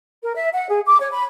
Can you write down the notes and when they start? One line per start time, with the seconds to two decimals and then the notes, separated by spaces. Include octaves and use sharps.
0.23 A#4
0.35 E5
0.52 F#5
0.69 G#4
0.85 D6
1.00 C#5
1.12 B5